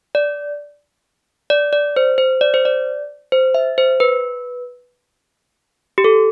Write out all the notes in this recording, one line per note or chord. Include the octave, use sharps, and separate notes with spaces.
D5
D5
D5
C5
C5
D5
C5
D5
C5
E5
C5
B4
G4
A4